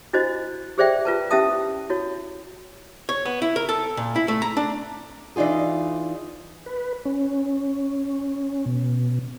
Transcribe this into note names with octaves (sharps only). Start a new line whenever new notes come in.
D4 E4 F#4 C5 D#5
G4 G#4 C5 D5 E5 G5
F4 B4 A5
C#4 E4 G4 E5 A5 D#6
E4 F#4 C#5
C#5
B3
E4
A#4
A4
A#2
E4
A3
A#5
D4
E3 D4 D#4 F4 G#4
B4
C#4
B2